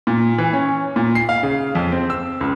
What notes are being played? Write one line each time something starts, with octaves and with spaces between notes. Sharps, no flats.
A#2
E3
C#4
A#2
C7
F5
C#3
F2
C4
E6
C#2